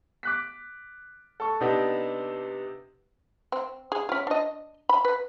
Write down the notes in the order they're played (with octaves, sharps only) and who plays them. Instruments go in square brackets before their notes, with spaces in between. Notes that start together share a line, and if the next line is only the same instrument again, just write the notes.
[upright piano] D6 F#6 B6
A4 C#6
C3 B3 D4 D#4 G4
[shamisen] C4
G#4
C#4 F4
D4 D#5
B5
B4